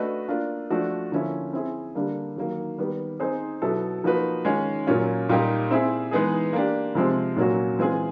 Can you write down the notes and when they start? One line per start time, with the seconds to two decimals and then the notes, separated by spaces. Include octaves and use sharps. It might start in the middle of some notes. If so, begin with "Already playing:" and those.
Already playing: A3 D4 F#4 B4 D#5
0.29 A#3 D4 F4
0.70 F3 A3 D4 F#4
1.12 D3 F3 A#3 C#4 E4
1.53 C4 E4 G#4
1.95 D3 G3 A#3 D4
2.36 D#3 F#3 A#3
2.78 D#3 G3 B3
3.20 C4 D#4 G#4 C5
3.62 B2 F#3 B3 E4 A4
4.04 F3 A#3 D#4 F#4 B4
4.45 D#3 G#3 C#4 F4
4.87 A#2 F#3 A#3 C#4 F4
5.29 A#2 G3 A#3 D#4 G4
5.71 C4 E4 G#4
6.11 E3 G#3 B3 D#4 G#4
6.53 A#3 D4 G4
6.95 C3 F3 G#3 C4
7.37 A#2 F#3 A#3 C#4 F#4
7.79 E3 G#3 C4 F4 G#4